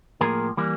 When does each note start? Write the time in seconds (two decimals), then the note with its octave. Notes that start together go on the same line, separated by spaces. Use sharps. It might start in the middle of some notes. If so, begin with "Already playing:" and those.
0.21 A2 F3 A#3 G#4 A#4
0.57 E3 G3 A#3